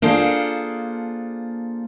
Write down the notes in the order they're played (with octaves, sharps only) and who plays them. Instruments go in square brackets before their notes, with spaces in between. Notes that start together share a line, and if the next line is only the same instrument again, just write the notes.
[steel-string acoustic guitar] A#3 D4 F4 G#4 A4 C5